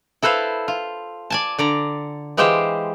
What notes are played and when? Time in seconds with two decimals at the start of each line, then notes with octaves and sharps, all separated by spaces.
0.22 E4 A4 B4 C5 F5
0.68 F4
1.30 D5 G#5 A5
1.58 D3 D5 A#5
2.37 E3 G#3 F4 G4 C5 G5